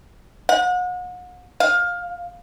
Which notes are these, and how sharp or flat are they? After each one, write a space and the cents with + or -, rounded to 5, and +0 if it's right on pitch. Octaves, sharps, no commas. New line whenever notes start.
F#5 -40
F5 +15